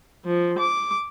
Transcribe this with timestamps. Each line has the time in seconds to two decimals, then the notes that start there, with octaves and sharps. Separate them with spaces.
0.25 F3
0.59 D6